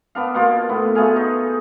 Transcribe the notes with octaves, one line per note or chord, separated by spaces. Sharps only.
B3 D4 F5
B2 A#3 F4
A2 B3
B2 A3 G#4 F5
D#4